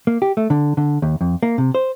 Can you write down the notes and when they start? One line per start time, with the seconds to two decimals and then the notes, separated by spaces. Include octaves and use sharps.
0.07 A#3
0.22 G4
0.37 A3
0.50 D3
0.77 D3
1.02 D#2
1.21 F2
1.43 A#3
1.58 C3
1.75 C5